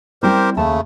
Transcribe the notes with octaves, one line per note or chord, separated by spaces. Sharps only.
G3 C4 E4 G4 A#4 C5
D#2 C#3 A3 A5